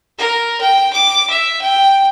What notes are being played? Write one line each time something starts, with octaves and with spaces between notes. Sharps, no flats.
A#4
G5
D6
E5
G5